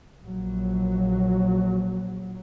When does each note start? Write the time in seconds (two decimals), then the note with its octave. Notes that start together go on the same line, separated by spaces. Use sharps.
0.21 A#1 F#3